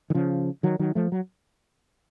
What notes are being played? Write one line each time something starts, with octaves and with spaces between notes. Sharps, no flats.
D#3
C#3 F3
D#3 F#3
D#3 F#3
F3 A3
F#3